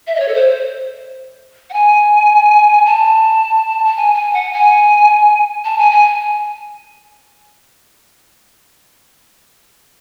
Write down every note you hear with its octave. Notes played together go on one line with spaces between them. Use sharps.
E5
D#5
C#5
A4
C5
F#5
G#5
A5
A5
G#5
G#5
F#5
G#5
A5
G#5
G#5